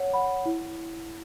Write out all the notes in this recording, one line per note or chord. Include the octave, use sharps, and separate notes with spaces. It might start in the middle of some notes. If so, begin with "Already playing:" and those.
Already playing: C#5 F#5
F#5 B5
E4